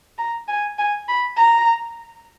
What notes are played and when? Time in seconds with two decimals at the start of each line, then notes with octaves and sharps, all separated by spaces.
0.18 A#5
0.48 G#5
0.78 G#5
1.09 B5
1.38 A#5